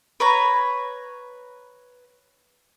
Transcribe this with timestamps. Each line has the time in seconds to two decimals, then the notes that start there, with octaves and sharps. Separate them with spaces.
0.20 B4 C#5 A#5